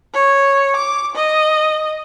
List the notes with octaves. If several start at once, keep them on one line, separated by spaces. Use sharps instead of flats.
C#5
D6
D#5